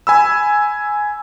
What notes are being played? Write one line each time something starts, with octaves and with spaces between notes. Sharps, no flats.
G#5 B5 E6